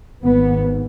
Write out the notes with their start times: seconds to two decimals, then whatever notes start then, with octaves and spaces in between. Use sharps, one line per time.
0.24 G#1 G#2 B3